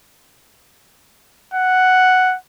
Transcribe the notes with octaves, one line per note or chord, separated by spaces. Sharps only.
F#5